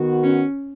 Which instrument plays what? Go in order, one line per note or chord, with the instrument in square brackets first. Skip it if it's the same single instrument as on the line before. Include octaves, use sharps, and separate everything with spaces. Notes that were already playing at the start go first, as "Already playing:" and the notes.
Already playing: [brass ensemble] D#3 B3 F#4
[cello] C#4